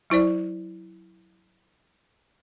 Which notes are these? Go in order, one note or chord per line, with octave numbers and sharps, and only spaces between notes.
F#3 E4 C5 D5